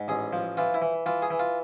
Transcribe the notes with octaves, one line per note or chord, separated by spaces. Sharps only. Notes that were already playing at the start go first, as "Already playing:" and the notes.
Already playing: G#2
A1 G#4
F3
E3 F4
E4
E3
E3 F4
G#4
E3
F4